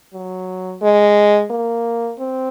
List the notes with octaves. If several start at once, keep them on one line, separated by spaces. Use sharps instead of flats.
F#3
G#3
A#3
C4